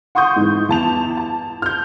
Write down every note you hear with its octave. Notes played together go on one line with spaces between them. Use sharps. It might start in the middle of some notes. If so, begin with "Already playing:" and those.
F#5 C6 C#6 D#6 G6
G#2 E3
E2 A5 F7
A5
F6 G6